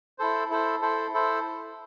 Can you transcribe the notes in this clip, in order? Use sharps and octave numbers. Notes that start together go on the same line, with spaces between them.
E4 A4 C5
E4 A4 C5
E4 A4 C5
E4 A4 C5